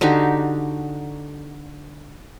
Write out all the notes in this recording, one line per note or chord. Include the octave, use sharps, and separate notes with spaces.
D3 D#4 F#4 G4